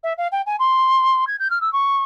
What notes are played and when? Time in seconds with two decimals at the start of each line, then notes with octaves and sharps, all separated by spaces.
0.03 E5
0.17 F5
0.31 G5
0.46 G#5
0.59 C6
1.27 G#6
1.39 G6
1.50 F6
1.61 E6
1.72 C#6